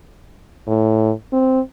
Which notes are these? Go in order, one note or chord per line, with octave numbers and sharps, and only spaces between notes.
A2
C4